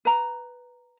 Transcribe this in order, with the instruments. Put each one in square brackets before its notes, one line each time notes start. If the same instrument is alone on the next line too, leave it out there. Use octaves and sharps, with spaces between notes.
[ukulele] B4 A#5